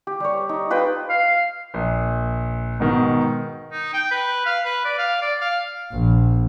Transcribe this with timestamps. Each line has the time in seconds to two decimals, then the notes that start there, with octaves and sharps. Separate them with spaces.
0.07 G4
0.20 G3 C#5
0.49 D#4
0.70 F4 B4 D#5 G5
1.10 F5
1.74 A#1
2.80 G#2 B2 D#3
3.72 D#4
3.93 G5
4.11 B4
4.46 F5
4.66 B4
4.85 D5
4.99 F5
5.22 D5
5.41 F5
5.91 A#1